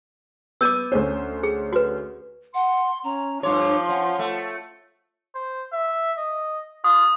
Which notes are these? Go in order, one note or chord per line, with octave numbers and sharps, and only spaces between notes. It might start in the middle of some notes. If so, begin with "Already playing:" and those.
B3 D6 E6 G6 D#7
D2 C#4 C5
G#4
F#4 B4
F#5 C6
C#4 A#5
G2 F3 C#5 C6 D6
C#4 F#5
A3
C5
E5
D#5
F4 D#6